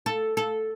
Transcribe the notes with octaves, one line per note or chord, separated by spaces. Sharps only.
A4
A4